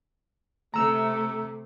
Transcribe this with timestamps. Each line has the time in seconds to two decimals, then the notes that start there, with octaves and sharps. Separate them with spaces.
0.74 C3 A3 A#5 E6